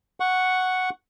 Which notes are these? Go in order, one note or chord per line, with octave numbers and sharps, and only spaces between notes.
F#5 C#6